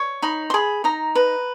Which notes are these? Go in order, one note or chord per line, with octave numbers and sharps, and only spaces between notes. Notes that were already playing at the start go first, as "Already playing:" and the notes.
Already playing: C#5
D#4 B5
C6
G#4 B5
D#4 A#5
B4